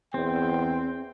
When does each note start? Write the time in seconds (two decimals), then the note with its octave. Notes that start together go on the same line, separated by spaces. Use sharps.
0.14 E2 C4 G5